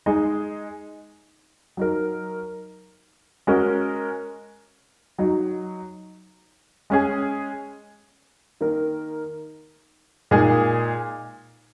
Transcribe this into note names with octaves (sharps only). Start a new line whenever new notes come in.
G#3 D#4 G#4
F#3 D#4 A#4
G#3 C#4 F#4 A#4
F#3 D#4 F#4
G#3 C#4 G#4
D#3 A#3 D#4 A#4
A#2 G#3 D#4 G#4